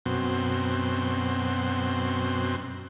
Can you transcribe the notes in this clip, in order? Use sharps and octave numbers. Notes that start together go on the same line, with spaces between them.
F#2 B2 C4